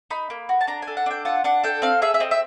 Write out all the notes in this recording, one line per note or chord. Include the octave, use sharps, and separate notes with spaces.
D#4 B5
A#3
F#4
A5
D4 A#5
G#5
A4
F#5
D4 G5
F4 F#5
D4 F#5
A4 G5
C4 F5
G#4 E5
E5
C4 D#5
E5